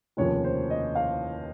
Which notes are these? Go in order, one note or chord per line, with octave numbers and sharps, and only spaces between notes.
F1 D#2 C#3 F3 C#5
C5
D#5
F5